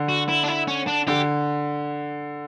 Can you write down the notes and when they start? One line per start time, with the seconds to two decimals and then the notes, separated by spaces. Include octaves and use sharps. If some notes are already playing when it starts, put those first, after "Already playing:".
Already playing: D3
0.09 F#4
0.29 E4
0.44 D4
0.48 E4
0.68 C#4
0.87 D4
1.07 D3 G4